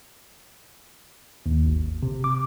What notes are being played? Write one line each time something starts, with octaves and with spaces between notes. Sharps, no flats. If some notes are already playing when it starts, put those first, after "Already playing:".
D#2
G#1
C3
D6